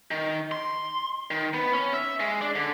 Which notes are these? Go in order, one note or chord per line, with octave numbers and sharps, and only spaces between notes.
D#3
C6
D#3
B3
C#4
E5
G#3
D4
D3